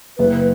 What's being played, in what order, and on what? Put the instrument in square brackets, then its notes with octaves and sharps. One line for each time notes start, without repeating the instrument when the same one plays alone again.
[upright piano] F#1 [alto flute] B4